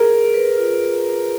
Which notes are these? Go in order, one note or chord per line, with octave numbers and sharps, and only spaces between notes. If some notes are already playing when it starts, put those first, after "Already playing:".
Already playing: G#4 A#4
G#4
B4
F4